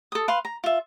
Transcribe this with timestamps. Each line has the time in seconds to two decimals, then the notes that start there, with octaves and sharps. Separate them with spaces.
0.12 A4 D#6
0.28 B4 F5 C6
0.45 A#5
0.64 F4 E5